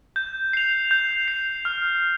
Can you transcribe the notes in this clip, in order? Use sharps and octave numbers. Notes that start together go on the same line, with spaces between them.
G6
C7 F7
G6
C7 F7
F6